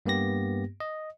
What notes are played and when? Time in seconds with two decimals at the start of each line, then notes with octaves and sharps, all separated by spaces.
0.06 G2 A#3 B3 G4 A#6
0.80 D#5